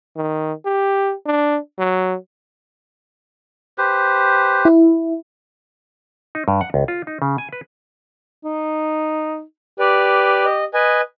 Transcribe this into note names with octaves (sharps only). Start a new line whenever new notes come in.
D#3
G4
D4
F#3
G4 B4 C5
E4
D#4
G2
F#5
C#2
F4
D#4
C#3
G#5
B4
D#4
G4 B4 D5
D#5
B4 D#5 G#5